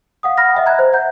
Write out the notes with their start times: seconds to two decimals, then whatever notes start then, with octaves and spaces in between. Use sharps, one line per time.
0.23 F5 F#5 D#6
0.38 F#5 B5 F6 A#6
0.54 D#5 E5 F#5 G5
0.66 A#5 F#6 G#6
0.79 C5
0.93 E5 F#5 A#5 G6